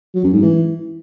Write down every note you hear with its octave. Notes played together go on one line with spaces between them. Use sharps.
F#3
F#2
G#2
E3